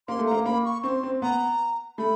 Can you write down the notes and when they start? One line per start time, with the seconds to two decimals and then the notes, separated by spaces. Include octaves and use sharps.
0.08 A#3 C6
0.19 A3
0.27 A#3 A#5
0.45 A#3 B5
0.65 C#6
0.83 C4 C#6
0.89 C6
1.03 C4
1.22 B3 A#5
1.98 A3 B5